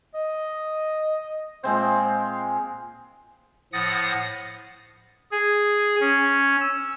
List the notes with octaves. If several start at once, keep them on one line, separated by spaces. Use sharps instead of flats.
D#5
A#2 G#3 C4 C5
A2 F3 F#5 D#6 A6 A#6
G#4
C#4
E6